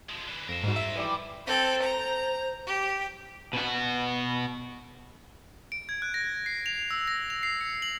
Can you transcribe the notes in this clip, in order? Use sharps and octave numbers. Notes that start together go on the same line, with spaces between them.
F3 G#3
D3 E3
F2 A#4 C5
G#2 G3 F#4
E5
E3 F3 G3 D6
C4 A4 C5
A#5
G4
B2 F#4
D7
G#6
F#6
A#6
C7
F7
E6
A#6
F7
C7
C#7
F#7